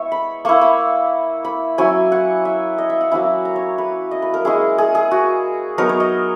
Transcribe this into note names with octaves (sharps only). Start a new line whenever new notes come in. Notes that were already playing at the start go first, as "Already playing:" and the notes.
Already playing: G#3 B3 E4 C#5 E5
B5
A#3 E4 C#6
B5
B5
F#3 C#4 E4 G#5
F#5
E5
D#5
E5
F#5
F#3 A#3 C#4 E4 G#5
A#5
C#5
B4
D#5
B4
A#4
G#3 C#4 E4 G#4
G#4
G#4
F#4
F#3 B3 D#4 A#4
C#5
D#5